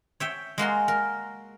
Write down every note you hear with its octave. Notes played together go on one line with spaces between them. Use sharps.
C#5 E5 G5
G#3 A#3 F#4 C6
A#4